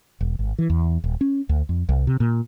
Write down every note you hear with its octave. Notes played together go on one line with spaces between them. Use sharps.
E1
G#1
E3
E2
D#1
C#4
D2
F2
C2
C3
A#2